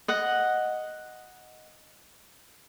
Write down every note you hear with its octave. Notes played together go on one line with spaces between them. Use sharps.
D#5 F#5